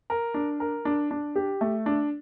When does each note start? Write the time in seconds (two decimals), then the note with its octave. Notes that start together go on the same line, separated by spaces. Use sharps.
0.10 A#4
0.34 D4
0.60 A#4
0.85 D4
1.11 D4
1.36 G4
1.61 A3
1.86 D4